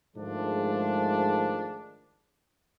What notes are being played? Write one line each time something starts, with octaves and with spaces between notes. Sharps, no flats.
G#2 D#3 F3 G#3 A3 D4